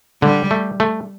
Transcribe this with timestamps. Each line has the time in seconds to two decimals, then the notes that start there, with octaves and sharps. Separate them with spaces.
0.22 D3 G3
0.51 A3
0.80 A3